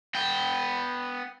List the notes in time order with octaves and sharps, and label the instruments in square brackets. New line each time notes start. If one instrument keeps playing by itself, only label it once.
[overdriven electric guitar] B3 G5